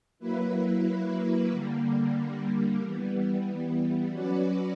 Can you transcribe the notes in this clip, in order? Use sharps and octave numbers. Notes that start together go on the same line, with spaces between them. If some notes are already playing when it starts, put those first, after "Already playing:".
F#3 A#3 E4 B4
D3 G3 A#3
E3 G3 B3
F#3 C#4 F#4 B4 D5